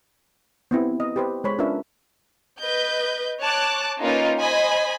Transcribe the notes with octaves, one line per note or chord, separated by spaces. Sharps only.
B3 C4 E4 G4
D#5
G4 B4 C5
G#3 C5 C#5 B5
C#4 D4 F4 A#4 B4 E5
B4 D#5 G6
C#5 A5 D6 F#6
A#3 C#4 D#4 F4 A#4 B4
C5 D#5 G#5 B5